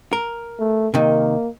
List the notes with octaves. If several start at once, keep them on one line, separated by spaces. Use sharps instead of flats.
A#4
A3
C3 D#3 A#3